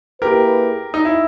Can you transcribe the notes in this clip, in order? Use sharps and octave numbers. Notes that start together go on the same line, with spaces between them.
A#3 E4 G4 G#4 A#4 B4
D#4
E4